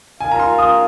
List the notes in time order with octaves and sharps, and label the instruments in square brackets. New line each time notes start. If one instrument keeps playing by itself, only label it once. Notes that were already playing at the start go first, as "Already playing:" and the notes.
[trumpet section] F4 A#4 F5 [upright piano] G#5
[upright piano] A#5
C6
D#6